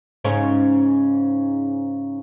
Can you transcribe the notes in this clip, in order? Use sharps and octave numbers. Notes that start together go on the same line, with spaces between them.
G#2 C#3 C#4